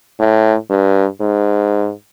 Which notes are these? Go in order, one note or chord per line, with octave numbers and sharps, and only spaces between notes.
A2
G2
G#2